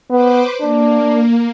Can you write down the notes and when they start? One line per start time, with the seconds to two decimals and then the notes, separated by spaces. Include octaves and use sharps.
0.11 B3 B4 C5 D6
0.61 A#3 D4